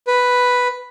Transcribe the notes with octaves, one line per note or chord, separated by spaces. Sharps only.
B4